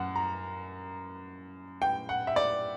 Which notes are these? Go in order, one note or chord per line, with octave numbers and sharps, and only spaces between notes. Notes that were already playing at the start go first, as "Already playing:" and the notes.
Already playing: F#2 F#5
A#5
G5
F#5
E5
D5